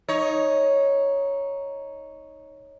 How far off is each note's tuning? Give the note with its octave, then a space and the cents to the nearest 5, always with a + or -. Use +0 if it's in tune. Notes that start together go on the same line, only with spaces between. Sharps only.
D#4 +5 C#5 +0